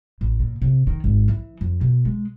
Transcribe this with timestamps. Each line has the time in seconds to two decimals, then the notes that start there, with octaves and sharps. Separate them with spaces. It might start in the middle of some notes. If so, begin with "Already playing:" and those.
0.21 A1
0.40 A#2
0.62 C3
0.87 D#3
1.04 G#1
1.28 E3
1.61 F2
1.81 B2
2.05 G#3